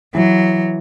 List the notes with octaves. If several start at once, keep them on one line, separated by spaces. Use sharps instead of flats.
E3 F#3